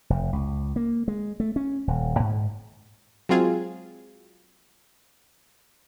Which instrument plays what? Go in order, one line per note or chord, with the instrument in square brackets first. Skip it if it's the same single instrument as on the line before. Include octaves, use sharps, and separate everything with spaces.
[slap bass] F1
C#2
A#3
G#3
A3
C#4
D#1
G#2
[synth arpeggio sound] F#3 G#3 C4 F4 G#4